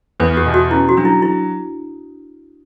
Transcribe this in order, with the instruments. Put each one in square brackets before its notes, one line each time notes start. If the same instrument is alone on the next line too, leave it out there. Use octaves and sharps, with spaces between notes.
[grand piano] E2 [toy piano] B4
[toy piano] G4
[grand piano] B2
[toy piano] F#4
[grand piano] C#4 [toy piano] E4
[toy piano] F#4
[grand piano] F#3 [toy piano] D4
[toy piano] E4
E4